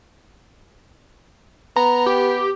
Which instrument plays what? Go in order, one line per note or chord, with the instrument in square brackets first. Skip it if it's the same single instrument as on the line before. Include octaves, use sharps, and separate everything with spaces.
[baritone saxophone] B3 [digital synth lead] A#5
[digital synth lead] G4